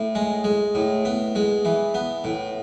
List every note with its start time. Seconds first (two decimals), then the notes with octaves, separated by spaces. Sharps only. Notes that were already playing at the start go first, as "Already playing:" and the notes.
Already playing: A2
0.15 G#3
0.44 G#3
0.75 A2
1.05 B3
1.35 G#3
1.65 E3
1.94 B3
2.24 A2